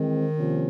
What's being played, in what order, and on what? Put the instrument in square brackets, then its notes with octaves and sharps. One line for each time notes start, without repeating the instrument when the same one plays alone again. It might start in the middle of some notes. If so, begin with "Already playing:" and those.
Already playing: [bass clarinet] D#3 [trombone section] E3 G#3 C4
[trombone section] C3 F3 A#3 C#4 F4